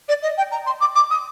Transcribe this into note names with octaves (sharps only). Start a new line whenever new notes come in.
D5
D#5
G5
A#5
C6
D6
D6
D#6